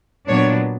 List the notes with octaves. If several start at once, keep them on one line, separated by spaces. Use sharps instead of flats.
A#2 F#3 B3 D4 C#5